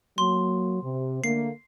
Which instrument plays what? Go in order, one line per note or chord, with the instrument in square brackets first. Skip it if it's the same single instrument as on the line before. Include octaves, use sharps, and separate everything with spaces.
[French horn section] F#3 A#3 [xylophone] C6
[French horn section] C3
[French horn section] D3 A3 A#3 [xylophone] C7